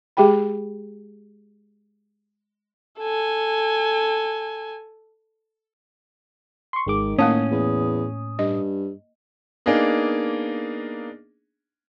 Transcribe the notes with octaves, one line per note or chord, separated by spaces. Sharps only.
G#3 G4 G#4 G5 B5
A4 G#5
C6 C#6
G#1 D#3 G#3 D6
A2 A#3 C#4 F5 A5 D#6
E2
G2 D#5
A#3 B3 D4 D#4 G#4